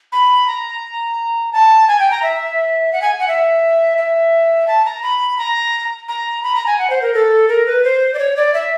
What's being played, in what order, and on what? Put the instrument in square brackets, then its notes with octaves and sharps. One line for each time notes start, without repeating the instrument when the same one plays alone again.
[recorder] B5
A#5
A5
G#5
G5
A#5
E5
F#5
G#5
F#5
E5
E5
A5
A#5
B5
A#5
A#5
B5
A#5
G#5
F#5
C5
A#4
A4
A#4
B4
C5
D5
C#5
D5
E5